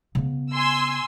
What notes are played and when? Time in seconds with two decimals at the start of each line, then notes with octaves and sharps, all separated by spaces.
0.15 C#3 B3
0.51 G#5 C6 E6